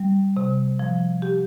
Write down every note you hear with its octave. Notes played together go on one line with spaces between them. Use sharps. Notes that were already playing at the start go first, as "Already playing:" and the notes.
Already playing: G3
C3
F3
G4